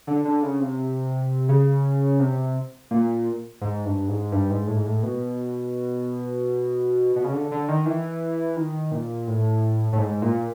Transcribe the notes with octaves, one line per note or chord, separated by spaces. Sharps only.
D3
D3
C#3
C3
C#3
C3
A#2
G#2
G2
G#2
G2
G#2
A2
G#2
A2
B2
B2
C#3
D3
D3
D#3
E3
D#3
A#2
A2
A2
G#2
A#2